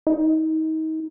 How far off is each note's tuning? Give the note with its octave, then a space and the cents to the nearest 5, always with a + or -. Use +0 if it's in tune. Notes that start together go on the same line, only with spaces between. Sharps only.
D#4 +30